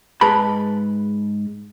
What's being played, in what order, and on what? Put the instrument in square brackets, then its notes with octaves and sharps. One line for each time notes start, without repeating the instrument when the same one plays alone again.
[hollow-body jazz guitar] G#2 G#4 B4 A5 B5